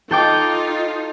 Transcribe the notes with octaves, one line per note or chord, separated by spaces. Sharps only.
D#4 F4 A4 G5 D6